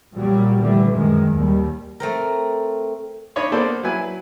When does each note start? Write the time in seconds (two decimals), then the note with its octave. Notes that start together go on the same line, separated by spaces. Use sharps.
0.14 A#2 F#3 G3 A#3
0.58 A#2 D3 E3 G3 A3
0.92 F#2 D#3 G#3
1.32 D#2 G3
2.00 A3 C4 A#4
3.36 D4 D#4 C#5 D#5 B5 C#6
3.52 A#3 B3 D4 A4 C5 D5
3.83 F#3 E4 B4 G#5